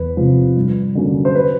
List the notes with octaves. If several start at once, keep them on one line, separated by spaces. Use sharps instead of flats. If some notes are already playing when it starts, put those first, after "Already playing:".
Already playing: E2 B4
C3 F3 G#3
G2
D3 F#3 A#3 C#4
C5
B4